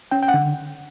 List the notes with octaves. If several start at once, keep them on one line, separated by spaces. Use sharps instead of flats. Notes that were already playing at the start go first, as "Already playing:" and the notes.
C#4 G5
G5
F#5
D3